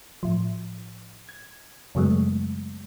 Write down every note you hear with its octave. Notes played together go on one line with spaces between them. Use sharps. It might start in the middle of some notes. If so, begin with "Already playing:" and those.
A2 F3
G#6
F#2 C#3 F#3 G#3 A3 B3